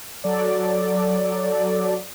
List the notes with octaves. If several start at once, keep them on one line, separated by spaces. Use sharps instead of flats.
F#3 A4 D5